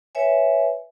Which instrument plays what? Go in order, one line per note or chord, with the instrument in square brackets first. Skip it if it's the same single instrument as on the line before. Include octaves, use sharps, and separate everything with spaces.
[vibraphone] B4 C#5 E5 G#5